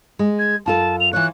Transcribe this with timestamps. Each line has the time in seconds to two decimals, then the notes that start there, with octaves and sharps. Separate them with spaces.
0.19 G#3
0.39 G#6
0.66 F#2 F4 A4 A5
1.00 F7
1.13 E3 F4 C#5 F#6